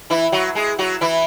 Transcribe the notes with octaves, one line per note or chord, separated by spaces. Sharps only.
E3 E4
F#3 F#4
G#3 G#4
F#3 F#4
E3 E4